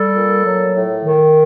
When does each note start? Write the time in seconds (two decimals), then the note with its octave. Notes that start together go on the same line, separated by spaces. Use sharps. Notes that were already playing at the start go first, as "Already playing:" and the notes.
Already playing: G3 A4
0.16 A#2
0.46 F#3
0.75 A2
1.05 D#3